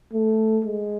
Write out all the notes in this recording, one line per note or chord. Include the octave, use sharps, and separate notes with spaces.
A3
G#3